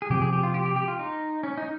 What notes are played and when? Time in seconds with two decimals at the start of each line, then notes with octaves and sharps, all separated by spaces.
0.02 G#4
0.10 C3 F3 C4 G4
0.22 G#4
0.33 G4
0.43 F4
0.54 G4
0.65 G4
0.76 G4
0.88 F4
0.99 D#4
1.43 C#4
1.58 D#4